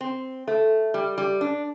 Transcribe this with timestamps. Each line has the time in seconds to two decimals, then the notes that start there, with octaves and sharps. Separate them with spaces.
0.01 C4
0.47 A3
0.94 G3
1.18 G3
1.41 D4